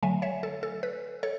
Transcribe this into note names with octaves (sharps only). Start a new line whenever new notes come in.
D3 F#3 A3 E5 G#5
C#5 E5
A4
A4
B4
A4 C#5